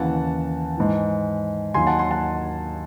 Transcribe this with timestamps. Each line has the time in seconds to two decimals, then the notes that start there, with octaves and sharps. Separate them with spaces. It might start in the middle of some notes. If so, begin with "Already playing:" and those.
Already playing: D#2 C#3 E3 F#5 A5
0.77 G#2 E3
1.74 D#2 D#3 F#3 G#5 C6
1.87 F#5 A5
1.99 G#5 C6
2.11 F#5 A5